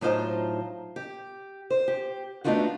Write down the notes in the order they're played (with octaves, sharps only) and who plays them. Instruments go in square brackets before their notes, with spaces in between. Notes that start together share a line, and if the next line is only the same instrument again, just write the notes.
[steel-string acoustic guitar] A2 F#3 D#4 F4 C5 A5
G4
C5
G4
A3 B3 D4 D#4 F4 F#4